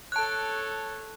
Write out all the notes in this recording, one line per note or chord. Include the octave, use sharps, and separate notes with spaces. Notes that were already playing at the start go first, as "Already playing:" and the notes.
A4 C#5 A5 F#6